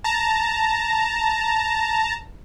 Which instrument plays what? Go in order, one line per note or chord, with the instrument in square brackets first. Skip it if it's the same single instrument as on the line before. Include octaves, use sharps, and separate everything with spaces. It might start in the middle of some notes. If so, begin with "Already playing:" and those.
[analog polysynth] A5 A#5